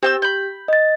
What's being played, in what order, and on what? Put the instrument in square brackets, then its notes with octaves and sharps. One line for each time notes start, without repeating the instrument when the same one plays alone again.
[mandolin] C4 G5 E6 [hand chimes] G4
[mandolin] B5 G6
[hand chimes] D#5 A6